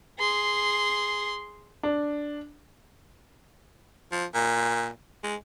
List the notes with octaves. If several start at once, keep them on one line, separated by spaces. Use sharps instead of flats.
G#4 C6
D4
F3
A#2
G#3